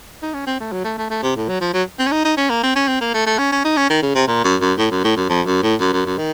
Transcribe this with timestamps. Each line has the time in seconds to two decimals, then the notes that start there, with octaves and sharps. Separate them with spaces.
0.22 D#4
0.34 C#4
0.47 C4
0.60 A3
0.72 F#3
0.85 A3
0.98 A3
1.10 A3
1.23 C3
1.36 A2
1.49 F#3
1.61 F3
1.74 F#3
1.99 C4
2.07 C#4
2.12 D#4
2.25 D#4
2.37 C#4
2.50 A#3
2.63 C4
2.76 C#4
2.88 C4
3.01 A#3
3.14 A3
3.26 A3
3.38 C#4
3.52 C#4
3.64 D#4
3.77 C#4
3.90 D#3
4.02 C#3
4.15 C3
4.28 A#2
4.44 F#2
4.61 F#2
4.78 A2
4.91 F#2
5.04 A2
5.16 F#2
5.29 F2
5.46 F#2
5.63 A2
5.81 F#2
5.93 F#2
6.05 F#2
6.18 D#3